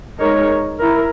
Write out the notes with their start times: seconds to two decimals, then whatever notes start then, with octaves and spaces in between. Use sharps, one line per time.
0.20 G#3 D#4 A#4 C#5
0.80 E4 A#4